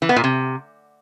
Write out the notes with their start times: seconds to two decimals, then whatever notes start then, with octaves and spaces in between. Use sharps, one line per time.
0.02 E3
0.09 B3
0.16 A#2
0.24 C3